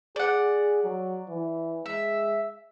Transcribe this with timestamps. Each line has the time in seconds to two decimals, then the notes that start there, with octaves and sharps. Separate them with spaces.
0.16 G#4 D5 F#5
0.84 F#3
1.29 E3
1.86 G#3 E5